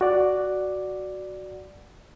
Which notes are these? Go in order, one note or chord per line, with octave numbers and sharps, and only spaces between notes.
F#4 D5 F#5